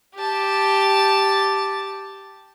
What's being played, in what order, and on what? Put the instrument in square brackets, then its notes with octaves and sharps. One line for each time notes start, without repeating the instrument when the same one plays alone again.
[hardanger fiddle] G4 A5